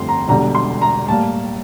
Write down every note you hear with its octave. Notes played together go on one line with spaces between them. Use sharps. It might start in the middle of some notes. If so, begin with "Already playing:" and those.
Already playing: G1 F2 D3 A3 C4 C6
A#5
E1 E2 D3 G3 A#5
C6
A#5
A2 G3 A#3 A5